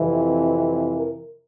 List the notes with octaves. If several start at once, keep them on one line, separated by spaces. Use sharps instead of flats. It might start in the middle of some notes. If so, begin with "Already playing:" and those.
Already playing: F2 C3 E3
A#4